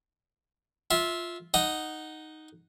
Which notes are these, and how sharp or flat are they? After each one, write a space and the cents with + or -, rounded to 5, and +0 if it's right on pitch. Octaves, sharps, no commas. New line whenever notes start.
F4 +0 E5 -10
D#4 +0 D#5 +0 F#5 +0